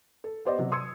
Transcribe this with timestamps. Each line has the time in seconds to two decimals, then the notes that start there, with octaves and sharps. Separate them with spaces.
0.24 A4
0.45 B3 G4 C5 D5 D#5
0.59 C3 F#3
0.72 C6 D#6 E6 G#6 C#7